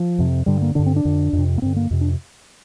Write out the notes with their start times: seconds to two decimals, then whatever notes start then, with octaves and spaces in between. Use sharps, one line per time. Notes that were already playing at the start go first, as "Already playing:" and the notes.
Already playing: F3
0.19 F2 C3
0.46 G2 D3 G3
0.62 A#3
0.75 G2 D3 D4
0.86 C4
0.96 D4
1.05 F2 D3
1.33 F2
1.38 C3
1.58 A#3
1.62 G2 D3 C4
1.76 A#3
1.91 F2 C3
2.01 D4